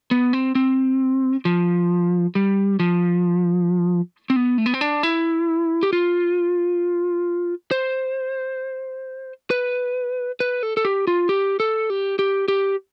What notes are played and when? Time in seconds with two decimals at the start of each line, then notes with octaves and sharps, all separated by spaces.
0.11 B3
0.33 C4
0.55 C4
1.45 F3
2.35 G3
2.79 F3
4.30 C4
4.36 B3
4.58 A3
4.66 B3
4.74 C4
4.81 D4
5.03 E4
5.83 G4
5.93 F4
7.71 C5
9.50 B4
10.40 B4
10.63 A4
10.77 A4
10.85 G4
11.07 F4
11.29 G4
11.60 A4
11.90 G4
12.19 G4
12.48 G4